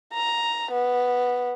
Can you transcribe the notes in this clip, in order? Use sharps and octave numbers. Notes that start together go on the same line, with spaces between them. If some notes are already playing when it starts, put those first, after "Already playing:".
A#5
B3